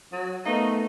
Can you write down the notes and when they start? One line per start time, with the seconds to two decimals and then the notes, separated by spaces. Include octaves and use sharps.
0.12 F#3
0.45 A3 B3 D#4 A#4 B4 F5